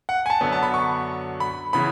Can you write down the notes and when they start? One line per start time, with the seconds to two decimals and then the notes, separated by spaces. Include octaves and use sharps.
0.09 F#5
0.26 G#5
0.30 A5
0.41 F#2 D3 F#3 B3
0.52 A5
0.63 B5
0.74 C#6
1.40 B5
1.73 C#3 E3 B3 B5